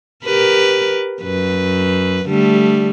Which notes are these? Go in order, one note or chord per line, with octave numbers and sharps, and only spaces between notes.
G4 A#4 B4
F#2 B4
D3 G3 A3